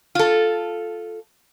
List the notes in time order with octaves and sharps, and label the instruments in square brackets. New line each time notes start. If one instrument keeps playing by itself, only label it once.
[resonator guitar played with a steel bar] F4 A4